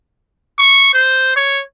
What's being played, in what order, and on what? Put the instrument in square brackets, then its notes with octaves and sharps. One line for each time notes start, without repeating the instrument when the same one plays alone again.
[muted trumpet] C#6
C5
C#5